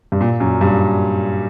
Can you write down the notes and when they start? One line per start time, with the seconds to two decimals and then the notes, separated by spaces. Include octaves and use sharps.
0.12 G2
0.21 A#2
0.40 F#2
0.61 G2